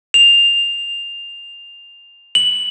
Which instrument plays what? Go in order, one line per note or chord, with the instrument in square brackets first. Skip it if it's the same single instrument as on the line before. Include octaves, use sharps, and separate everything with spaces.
[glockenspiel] F7
F#7